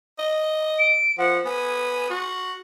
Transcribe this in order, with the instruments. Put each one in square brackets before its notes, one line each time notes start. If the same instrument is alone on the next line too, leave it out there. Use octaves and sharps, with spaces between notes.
[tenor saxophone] D#5
[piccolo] D7
[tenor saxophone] F3 [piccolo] F#5
[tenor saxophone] B3 [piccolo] G#5
[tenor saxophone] F#4